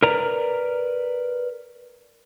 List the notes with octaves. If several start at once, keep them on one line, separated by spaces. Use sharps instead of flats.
A#4 B4 D5 A#5